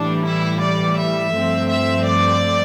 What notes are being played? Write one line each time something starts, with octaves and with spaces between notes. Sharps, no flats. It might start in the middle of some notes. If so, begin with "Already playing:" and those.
Already playing: A2 E3 G3 D4
E4
D5
E5
G2 F3 A3 C4
E5
D5